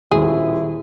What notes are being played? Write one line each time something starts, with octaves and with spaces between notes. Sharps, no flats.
D#1 D#2 E4 G#4